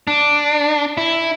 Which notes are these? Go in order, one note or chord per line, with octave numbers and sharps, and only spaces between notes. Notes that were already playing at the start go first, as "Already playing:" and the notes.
D4
E4